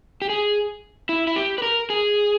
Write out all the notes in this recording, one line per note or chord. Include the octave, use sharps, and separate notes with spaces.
G4
G#4
E4
E4
G4
B4
A#4
G#4